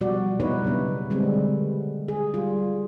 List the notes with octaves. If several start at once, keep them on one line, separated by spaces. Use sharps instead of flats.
B2 F3 G3 F#4 D5
G3 B3 D#4 E4 B4 C#5
C#3 F#3 B3 D4
D3 G3 G#3 B3 C4
G#4
G3 F4